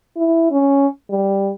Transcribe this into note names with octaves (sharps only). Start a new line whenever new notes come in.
E4
C#4
G3